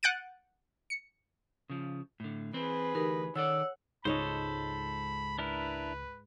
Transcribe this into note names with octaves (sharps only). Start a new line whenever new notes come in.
F#5 F#6 G6 A6 D7 D#7
C#7
C#3 F3
A2 D3
E3 C4 G#4 B4
D2 E3 D#4 G4 A#4
D#3 A4 C#5 D5 F#5 E6
C#2 G#2 A4 C5 C#5 D#5 B5
D4 E4 A#4 B4